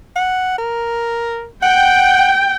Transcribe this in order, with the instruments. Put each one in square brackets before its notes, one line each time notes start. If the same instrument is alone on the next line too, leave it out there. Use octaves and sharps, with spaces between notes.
[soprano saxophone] F#5
A#4
[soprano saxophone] F#5 [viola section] G5